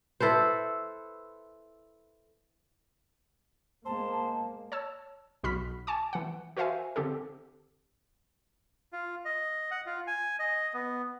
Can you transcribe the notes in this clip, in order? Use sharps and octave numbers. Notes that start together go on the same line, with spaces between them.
E4 A4 B4 C5
G#3 A#3 C5 A5
C#5 A5 E6
B1 B2 F#4 B5 F6 B6
G#5 A5 C#6 D6
E3 F#5
F#4 A#4 C5 E5 F5 G#5
D3 C4 G4 A4
F4
D#5
F#5
F4
G#5
D#5
B3